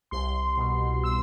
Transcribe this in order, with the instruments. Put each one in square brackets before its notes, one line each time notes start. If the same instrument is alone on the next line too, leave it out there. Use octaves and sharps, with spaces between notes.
[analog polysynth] C2 C6
B2
E6